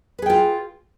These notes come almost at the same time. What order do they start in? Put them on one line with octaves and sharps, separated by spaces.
B4 G#4 G5 F4